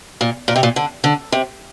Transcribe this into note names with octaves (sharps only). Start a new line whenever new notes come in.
A#2
A#2
C3
A#2
D3
D3
C3